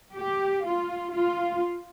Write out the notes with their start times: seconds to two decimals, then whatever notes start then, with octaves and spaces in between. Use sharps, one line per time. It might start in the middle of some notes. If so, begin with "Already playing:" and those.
0.16 G4
0.64 F4
1.14 F4